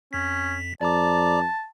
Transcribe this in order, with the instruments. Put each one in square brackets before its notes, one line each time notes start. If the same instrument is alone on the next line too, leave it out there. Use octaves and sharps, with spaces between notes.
[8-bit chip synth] F2 B6 [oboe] C#4
[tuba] F2 [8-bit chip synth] D5 A#5 D6 [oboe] A5